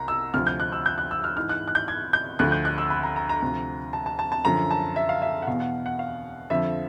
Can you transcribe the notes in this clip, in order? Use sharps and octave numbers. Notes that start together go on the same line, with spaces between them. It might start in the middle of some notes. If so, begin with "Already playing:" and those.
Already playing: C2 A#5
E6
D2 C3 F3 F6
G6
F#6
E6
G6
F#6
E6
F6
G#2 E3 F6
F#6
F#6
G6
G#6
G6
D2 D3 F3 F#6
G6
F#6
E6
B5
A#5
A#5
A#5
D2 C3 F3
A5
A5
A5
A5
F#2 D3 F3 A#5
A5
E5
F5
E5
F#5
E2 B2 F5
F#5
F#5
F5
F2 D3 F3 E5